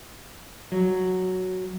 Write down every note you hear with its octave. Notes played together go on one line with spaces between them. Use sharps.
F#3